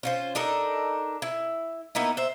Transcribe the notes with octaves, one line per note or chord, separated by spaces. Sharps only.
C#4 F4 C5
D4 D#4 A4 A#4
E4
A#3 B3 D#4 E4
C5 E5